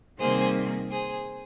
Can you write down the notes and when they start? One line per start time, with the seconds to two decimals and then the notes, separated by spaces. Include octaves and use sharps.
0.19 C3 D#3 G3 A#3 G#4 C5
0.91 G#4 C5